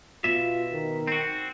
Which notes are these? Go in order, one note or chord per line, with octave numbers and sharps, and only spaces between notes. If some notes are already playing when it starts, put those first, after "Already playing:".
B2 F4 E5
D#3
C4 F#4